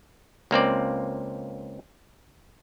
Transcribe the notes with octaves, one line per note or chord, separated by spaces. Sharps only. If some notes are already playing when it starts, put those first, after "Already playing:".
C#2 A#3 C4 D5